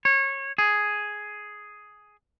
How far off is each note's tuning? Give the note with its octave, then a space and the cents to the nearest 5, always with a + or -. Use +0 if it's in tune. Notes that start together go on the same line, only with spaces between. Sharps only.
C#5 -25
G#4 +5